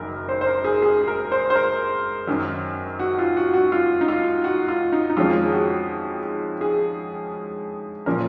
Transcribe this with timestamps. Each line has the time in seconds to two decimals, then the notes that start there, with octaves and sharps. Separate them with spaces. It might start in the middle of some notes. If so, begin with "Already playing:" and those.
Already playing: F#1 F#2 D#3 A#4
0.29 C5
0.41 C5
0.47 A#4
0.64 G#4
0.82 G#4
1.01 G#4
1.08 A#4
1.32 C5
1.50 C5
1.55 A#4
2.27 F#2 D#3 F#3
2.99 F#4
3.19 F4
3.37 F#4
3.54 F#4
3.72 F4
4.01 D#4
4.08 F4
4.44 F#4
4.68 F4
4.92 D#4
5.10 D#4
5.17 F2 D#3 G#3 C#4 F4
5.43 G#4
5.53 F#4
6.61 G#4
8.06 A#2 F3 A#3 C#4 A#4